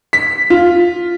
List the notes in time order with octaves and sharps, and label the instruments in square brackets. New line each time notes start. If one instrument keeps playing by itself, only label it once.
[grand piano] B6
F4